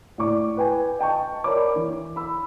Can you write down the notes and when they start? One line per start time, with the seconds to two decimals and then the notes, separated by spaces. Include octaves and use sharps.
0.18 A2 D5 C#6 D6
0.57 B4 G5 G#5
0.99 D#5 G5 A5 C#6
1.44 A#4 C#5 D5 B5 D6
1.76 E3
2.16 B5 E6